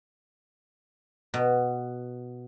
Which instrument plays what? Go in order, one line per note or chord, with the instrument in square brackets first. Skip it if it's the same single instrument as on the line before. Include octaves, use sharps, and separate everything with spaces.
[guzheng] B2